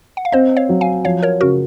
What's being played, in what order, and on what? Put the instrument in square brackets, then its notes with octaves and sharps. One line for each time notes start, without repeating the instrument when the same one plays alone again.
[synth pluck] F#5
F5
[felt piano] C4 [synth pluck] C5 D#5
[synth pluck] C#5 F5
[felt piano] F#3
[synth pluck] F5 G#5
[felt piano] F3 [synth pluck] C#5 F5
[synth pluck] A#4 C#5
[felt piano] C#3 [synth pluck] F#4 A#4